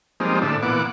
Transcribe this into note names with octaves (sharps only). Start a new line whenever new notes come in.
F3 G3 G#3 A#3 C4 D#4
A2 D3 D4 E5
A#2 E3 B3 F#5 D6